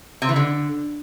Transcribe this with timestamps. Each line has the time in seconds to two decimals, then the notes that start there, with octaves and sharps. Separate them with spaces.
0.22 C3
0.29 E3
0.36 D3